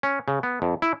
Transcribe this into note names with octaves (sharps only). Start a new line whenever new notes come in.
C#4
C#3
B3
F2
E4